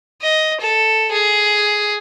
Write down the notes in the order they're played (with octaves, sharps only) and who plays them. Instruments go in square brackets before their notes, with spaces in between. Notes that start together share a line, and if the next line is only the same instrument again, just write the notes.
[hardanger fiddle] D#5
A4
G#4